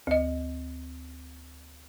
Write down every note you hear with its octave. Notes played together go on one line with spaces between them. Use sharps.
D2 D#5